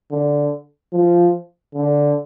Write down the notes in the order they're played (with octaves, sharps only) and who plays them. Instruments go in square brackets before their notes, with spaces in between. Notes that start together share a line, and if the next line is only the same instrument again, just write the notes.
[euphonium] D3
F3
D3